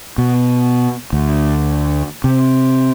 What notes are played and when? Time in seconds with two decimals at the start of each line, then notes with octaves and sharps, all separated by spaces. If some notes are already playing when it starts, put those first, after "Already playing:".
0.18 B2
1.13 D2
2.24 C3